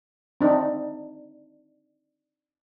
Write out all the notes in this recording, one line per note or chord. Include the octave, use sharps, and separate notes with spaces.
C4 D4 D#4